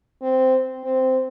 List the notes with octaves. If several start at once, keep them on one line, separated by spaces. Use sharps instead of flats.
C4
C4